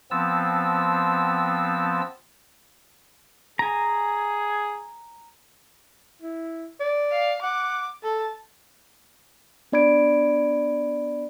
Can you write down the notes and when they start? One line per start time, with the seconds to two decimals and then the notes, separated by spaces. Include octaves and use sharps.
0.11 F3 B3 C4 A5 E6
3.59 G#4 G#5 A#5
6.22 E4
6.80 D5
7.12 F5
7.43 F#5 D6
8.04 A4 A5
9.72 B3 D4 D5 B5 G#6 D7